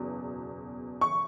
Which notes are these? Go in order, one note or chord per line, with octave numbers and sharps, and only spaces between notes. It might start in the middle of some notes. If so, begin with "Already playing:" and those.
Already playing: F#1 E2 B2
C#6